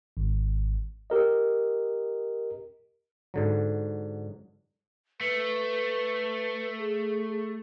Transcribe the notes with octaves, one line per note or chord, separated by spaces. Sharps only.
G#1
G4 A#4 D#5
G#2 D3 F#3
A3 B4
G#4